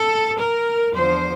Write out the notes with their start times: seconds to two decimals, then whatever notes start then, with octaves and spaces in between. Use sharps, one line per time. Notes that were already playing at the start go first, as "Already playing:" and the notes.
Already playing: A4
0.39 A#4
0.93 E2 D3 F3 C5